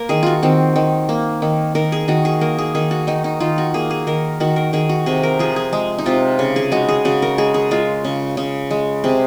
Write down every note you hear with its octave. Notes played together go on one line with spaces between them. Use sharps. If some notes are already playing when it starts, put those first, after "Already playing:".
Already playing: A#3 A#4
D#3 G#4
F4 F#4
D#3 C4
D#3
A#3
D#3
D#3 A#4
G#4
D#3 F#4
G#4
A#3 A#4
G#4
D#3 G#4
F#4
D#3 D#4
D#4
D#3 F4
F#4
A#3 G#4
G#4
D#3 A#4
D#3 F#4
A#4
D#3 G#4
F#4
C3 G#4
A#4
F3 G#4
G#4
G#3 G#4
D#4
C3 F4
C#3
G#4
G#3 F#4
G#4
C#3 F#4
A#4
G#3 G#4
G#4
G#3 F4
C#3
C#3
G#3
C3 G#4